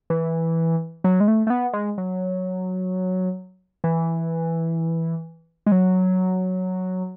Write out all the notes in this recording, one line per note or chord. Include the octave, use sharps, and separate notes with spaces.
E3
F#3
G#3
A3
A3
B3
G#3
F#3
E3
G#3
F#3